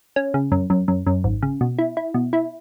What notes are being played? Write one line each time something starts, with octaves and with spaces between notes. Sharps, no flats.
C#4
C#3
F#2
F#2
F#2
F#2
G#1
C#3
B2
E4
E4
B2
E4